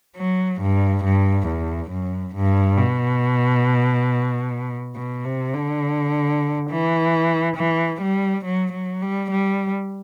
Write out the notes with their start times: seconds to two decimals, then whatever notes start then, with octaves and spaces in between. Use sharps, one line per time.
0.17 F#3
0.61 G2
1.04 G2
1.48 E2
1.91 F#2
2.36 G2
2.78 B2
4.96 B2
5.25 C3
5.54 D3
6.71 E3
7.57 E3
8.02 G3
8.45 F#3
8.73 F#3
9.02 G3
9.31 G3